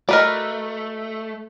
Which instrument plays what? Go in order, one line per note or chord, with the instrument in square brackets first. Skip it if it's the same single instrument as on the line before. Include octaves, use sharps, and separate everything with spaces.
[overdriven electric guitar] A3 [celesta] F#4 D#5 [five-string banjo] A#4 B4 D5